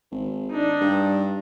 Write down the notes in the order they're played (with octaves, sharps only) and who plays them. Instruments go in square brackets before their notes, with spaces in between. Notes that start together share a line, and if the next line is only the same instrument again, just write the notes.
[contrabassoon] G#1
[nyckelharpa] D4 D#4
[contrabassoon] G2